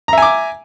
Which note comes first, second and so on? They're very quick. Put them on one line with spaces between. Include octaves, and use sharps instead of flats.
A#5 E5 G#5 D6